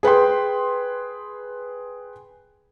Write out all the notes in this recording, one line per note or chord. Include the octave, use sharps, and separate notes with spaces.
G#4 B4 G5 C6